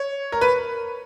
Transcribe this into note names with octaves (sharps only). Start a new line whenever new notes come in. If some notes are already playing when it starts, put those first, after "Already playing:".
Already playing: C#5
A#4
B4